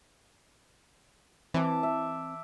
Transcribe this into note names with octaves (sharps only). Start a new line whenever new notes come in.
E3 C4 E5 A5 D6
E5